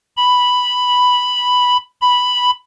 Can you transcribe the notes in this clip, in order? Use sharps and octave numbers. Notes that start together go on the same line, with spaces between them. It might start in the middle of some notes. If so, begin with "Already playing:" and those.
B5
B5